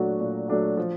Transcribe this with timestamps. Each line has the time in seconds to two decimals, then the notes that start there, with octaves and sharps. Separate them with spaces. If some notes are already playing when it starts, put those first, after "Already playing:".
Already playing: A#2 F#3 A3 D4 F#4
0.20 A#2
0.48 F#3 A3 D4 F#4
0.77 F3